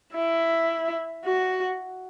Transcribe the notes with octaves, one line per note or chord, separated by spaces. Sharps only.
E4
F#4